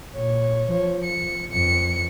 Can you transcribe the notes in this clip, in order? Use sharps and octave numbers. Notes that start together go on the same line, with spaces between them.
A#2 C#5
F3 C#5
C#7
F2 C#7